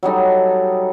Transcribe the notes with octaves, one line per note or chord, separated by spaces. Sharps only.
F#3 G3 D#4 A4